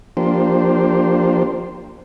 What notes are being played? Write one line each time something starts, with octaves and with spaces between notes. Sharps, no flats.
F3 A#3 D4 G4 C5